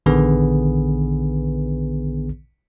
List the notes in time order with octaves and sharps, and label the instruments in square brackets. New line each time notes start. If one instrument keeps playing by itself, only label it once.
[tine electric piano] A#1 D3 D#3 B3 G#4 B4